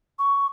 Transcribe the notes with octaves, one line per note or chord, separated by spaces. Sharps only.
C#6